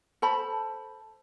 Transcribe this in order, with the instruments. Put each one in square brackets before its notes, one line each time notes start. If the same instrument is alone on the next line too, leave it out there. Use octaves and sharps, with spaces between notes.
[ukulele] A4 C5 A5 B5